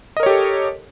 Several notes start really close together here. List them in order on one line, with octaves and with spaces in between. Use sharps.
D#5 A#4 C#5 G4 A4